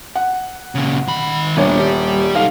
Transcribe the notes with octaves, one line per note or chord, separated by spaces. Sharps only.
F#5
A#2 C#3
D#3 B5
D#1 B3 D4 C#5
G4 D5
D#4 A4 F5